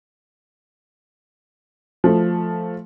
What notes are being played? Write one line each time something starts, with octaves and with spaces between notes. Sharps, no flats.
F3 A3